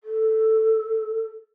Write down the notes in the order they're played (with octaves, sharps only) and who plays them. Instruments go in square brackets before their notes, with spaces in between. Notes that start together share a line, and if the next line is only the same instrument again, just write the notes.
[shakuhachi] A4